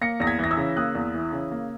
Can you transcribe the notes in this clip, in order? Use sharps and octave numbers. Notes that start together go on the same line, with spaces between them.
A#3 A#6 C#7
E2 A#6
G#6 B6
E3 A#6
E6 G#6
C#3
A#3 D#6 F#6
E2
E3
C#3
A#3